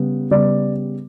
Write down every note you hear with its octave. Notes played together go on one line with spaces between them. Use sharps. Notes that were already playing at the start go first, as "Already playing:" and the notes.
Already playing: C#3 G3 B3
C#3 G3 B3 D5